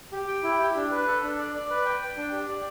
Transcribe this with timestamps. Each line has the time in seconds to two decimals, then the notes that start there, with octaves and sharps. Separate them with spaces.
0.12 G4
0.28 G5
0.43 E4
0.60 G4
0.75 D4
0.91 B4
1.07 A4
1.22 D4
1.38 D5
1.54 D5
1.70 B4
1.85 G5
2.01 G5
2.17 D4
2.32 G4
2.49 D5